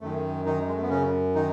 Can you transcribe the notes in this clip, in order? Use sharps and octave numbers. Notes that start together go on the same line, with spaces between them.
F#2 D#3 A3
D#3 D#4
G#3
A3
B3
C#3 C#4
D#3 D#4